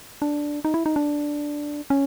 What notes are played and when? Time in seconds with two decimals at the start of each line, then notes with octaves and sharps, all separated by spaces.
0.22 D4
0.65 D#4
0.74 E4
0.86 D#4
0.96 D4
1.90 C#4